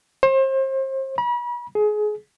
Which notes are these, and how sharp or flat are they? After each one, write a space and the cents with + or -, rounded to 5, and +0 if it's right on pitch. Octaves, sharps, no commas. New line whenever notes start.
C5 +35
B5 -40
G#4 +25